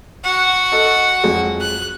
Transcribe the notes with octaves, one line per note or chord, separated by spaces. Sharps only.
F#4 F#5
A4 D#5
F2 F#3 G#3
F#6